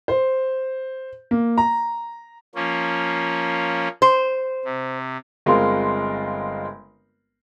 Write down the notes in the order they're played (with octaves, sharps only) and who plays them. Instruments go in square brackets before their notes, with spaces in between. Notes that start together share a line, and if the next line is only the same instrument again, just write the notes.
[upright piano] C5
A#3
A#5
[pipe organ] F3 A#3 C#4
[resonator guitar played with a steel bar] C5
[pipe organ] C3
[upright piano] G1 G#3 C4 F4 A#4 C6